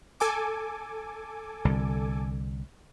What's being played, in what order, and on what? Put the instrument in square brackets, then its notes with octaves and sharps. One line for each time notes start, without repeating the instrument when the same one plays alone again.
[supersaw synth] A4 G#5 D6
[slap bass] C2 D3